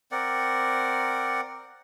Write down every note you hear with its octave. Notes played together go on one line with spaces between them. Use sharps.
C4 A#4 D5 F#5